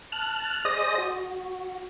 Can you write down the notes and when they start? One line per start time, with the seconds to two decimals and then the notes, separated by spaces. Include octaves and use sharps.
0.12 A5 F6 F#6
0.65 G#4 C5 D5 D#5 D#6 A#6
0.98 F#4